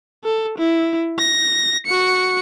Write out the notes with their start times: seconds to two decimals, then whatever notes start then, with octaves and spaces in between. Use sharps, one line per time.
0.24 A4
0.58 E4
1.19 A#6
1.86 F#4 C#7